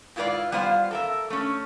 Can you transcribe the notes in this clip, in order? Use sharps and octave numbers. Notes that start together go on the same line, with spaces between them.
G#2 E4 F4 B4 D5 F5
G3 B3 F4 C5 F5
A4 A#4 E5
A3 C#4